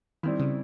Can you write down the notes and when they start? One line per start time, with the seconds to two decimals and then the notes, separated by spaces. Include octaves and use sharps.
0.23 D#3 G3 C4 E4
0.40 C#3